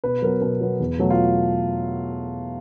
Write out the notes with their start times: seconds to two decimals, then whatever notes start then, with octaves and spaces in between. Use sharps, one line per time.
0.04 B2 B4
0.22 F#3 B3 A#4
0.41 B2 B4
0.61 F#3 B3
0.80 E2
0.99 B2 F#3 A3
1.10 F4